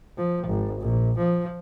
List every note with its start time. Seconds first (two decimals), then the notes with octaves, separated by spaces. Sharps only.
0.17 F3
0.47 G#1
0.81 A#1
1.18 F3